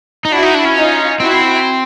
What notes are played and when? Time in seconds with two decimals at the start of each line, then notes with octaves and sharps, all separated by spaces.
0.25 D#4
0.32 D4 E4 F#4
0.43 D#4
0.55 D4
0.65 C#4
0.76 D#4 F4
1.20 C4 E4 F#4